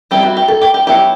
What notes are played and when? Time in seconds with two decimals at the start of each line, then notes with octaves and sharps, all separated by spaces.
0.11 G3 C4 E4 G4
0.23 F#4
0.37 G4
0.48 A4
0.61 G4
0.74 G4
0.87 F#3 B3 E4 G4